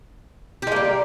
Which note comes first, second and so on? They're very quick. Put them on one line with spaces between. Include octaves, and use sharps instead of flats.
G4 G#3 A#3 G3